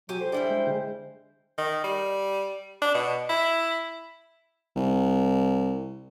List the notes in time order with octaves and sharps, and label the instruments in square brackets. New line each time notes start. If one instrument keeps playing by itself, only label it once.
[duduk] F#3 [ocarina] F#4 [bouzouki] G4 G#5
[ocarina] A4 [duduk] C5
[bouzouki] G3 E4 G5 [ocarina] D4 [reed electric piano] G#4 D5
[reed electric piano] G#3
D3 G#3
[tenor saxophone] D#3
G3
D4
B2
E4
[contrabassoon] C2